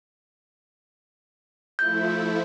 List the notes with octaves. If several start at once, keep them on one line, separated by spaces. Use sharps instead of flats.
F3 A3 E4 G6